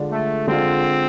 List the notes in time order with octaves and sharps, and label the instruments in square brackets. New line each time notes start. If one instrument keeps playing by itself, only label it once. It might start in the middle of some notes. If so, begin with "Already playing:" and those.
Already playing: [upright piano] D3 G#3 D4 F4
[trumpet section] A3
[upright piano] D3 G#3 D4 F4 [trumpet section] C4